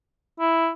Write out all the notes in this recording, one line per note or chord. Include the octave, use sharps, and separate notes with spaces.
E4